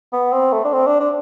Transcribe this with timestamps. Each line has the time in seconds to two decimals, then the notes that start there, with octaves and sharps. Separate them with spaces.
0.12 B3
0.32 C4
0.52 A3
0.65 D4
0.73 C4
0.86 D4
1.00 D4